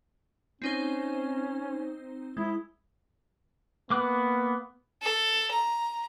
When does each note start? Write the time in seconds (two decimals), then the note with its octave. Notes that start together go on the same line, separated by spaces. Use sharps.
0.62 C4 C#4 D#4 C5
2.37 G#3 E4
3.90 A#3 B3 D6 F#6
5.02 A4
5.52 A#5